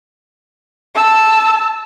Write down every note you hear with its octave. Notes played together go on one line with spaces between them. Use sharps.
A5 E6